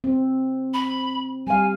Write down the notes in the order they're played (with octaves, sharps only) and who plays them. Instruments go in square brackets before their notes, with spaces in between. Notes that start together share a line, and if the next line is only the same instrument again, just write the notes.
[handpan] C4
[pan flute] B5
[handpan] G3 F5 [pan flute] G#5